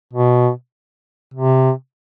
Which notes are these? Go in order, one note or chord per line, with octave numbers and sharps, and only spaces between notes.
B2
C3